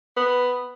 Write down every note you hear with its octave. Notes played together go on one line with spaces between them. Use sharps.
B3